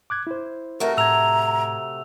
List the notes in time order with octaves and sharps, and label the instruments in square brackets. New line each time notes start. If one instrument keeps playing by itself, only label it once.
[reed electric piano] D6 F#6 G#6
E4 C5
[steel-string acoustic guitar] C3 A3 F#4 [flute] A#4
[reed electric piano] A2 G#6 [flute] A#5 [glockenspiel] E6 F7